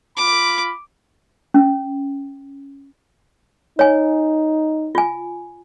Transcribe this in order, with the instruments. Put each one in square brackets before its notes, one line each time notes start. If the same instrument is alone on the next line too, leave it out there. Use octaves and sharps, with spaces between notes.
[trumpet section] F4 B5 [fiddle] D6
[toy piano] C#4
[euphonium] D#4 [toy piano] C#5 G#5
[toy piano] F4 G#5